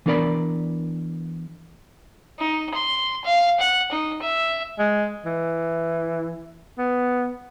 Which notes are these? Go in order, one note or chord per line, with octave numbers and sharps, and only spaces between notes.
E3 B3 D4 A#4 D5 B5
D#4
C6
F5
F#5
D#4
E5
G#3
E3
B3